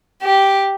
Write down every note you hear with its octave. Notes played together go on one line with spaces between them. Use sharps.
G4